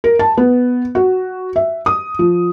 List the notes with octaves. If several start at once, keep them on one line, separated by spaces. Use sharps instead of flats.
A#4
A5
B3
F#4
E5
D#6
F3